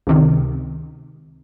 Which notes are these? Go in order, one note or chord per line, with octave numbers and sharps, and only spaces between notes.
C#2 C3 D#3